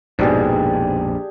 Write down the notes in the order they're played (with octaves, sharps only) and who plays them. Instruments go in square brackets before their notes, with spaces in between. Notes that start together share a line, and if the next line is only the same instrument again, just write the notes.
[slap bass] A#1 F2 [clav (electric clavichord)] G#2 B2 [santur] D4 G4 G#4